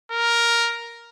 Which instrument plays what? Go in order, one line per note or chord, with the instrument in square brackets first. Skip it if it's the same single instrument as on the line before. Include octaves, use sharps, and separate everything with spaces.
[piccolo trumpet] A#4